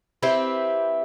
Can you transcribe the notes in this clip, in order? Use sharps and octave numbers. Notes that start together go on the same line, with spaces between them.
C4 E4 G4 B4